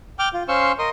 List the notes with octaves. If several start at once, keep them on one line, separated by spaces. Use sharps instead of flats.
G5 D6 F6
F4
C#4 C5 F5 C6 C#6 E6
A#4 D#5 C6 D#6